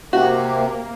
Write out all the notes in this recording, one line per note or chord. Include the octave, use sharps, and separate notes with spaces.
C3 A#3 F#4